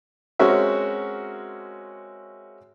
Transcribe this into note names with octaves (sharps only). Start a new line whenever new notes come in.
G#3 C4 C#4 F#4 A#4 E5